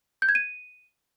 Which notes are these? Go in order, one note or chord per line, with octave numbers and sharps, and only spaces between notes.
G6
G#6
D#7